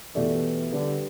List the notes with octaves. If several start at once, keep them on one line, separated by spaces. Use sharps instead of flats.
B2 E3 A3 G4 D5
D3 G3 D4 G4 B4 D5